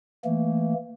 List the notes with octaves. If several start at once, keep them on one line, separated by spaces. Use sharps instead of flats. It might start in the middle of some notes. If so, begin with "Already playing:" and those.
E3 A3 A#3